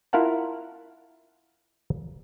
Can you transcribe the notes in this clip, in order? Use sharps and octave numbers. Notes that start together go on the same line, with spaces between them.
E4 F4 A#4 F5 F#5 A5